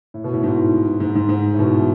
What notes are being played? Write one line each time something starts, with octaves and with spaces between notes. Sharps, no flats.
A2
B2
A2
G#2
G#2
G#2
G#2
A2
B2
E3